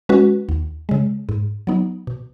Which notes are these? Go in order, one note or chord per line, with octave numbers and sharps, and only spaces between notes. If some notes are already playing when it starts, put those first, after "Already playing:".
G#3 C#4 F#4 B4
D#2
C#3 G#3
G#2
F#3 B3 D#4
B2